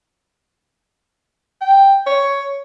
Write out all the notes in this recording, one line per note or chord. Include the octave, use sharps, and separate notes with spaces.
G5
C#5